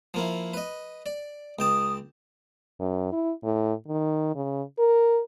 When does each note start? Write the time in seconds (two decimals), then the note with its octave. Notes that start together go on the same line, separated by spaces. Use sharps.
0.14 F3 A#3 E4
0.54 B4 D#5
1.06 D5
1.59 C#2 G5 A5 D#6
2.80 F#2
3.12 E4
3.43 A2
3.88 D#3
4.35 C#3
4.79 A#4